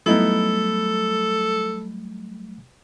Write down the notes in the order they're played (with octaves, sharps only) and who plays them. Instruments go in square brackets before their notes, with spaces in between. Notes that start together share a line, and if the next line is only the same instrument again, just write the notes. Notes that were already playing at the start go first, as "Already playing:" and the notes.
[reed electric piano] F#3 G3 A3 [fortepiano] B3 D#4 E4 [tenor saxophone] A4